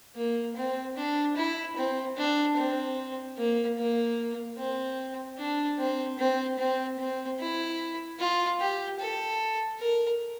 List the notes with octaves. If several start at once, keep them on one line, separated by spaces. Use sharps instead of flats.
A#3
C4
D4
E4
C4
D4
C4
A#3
A#3
C4
D4
C4
C4
C4
C4
E4
F4
G4
A4
A#4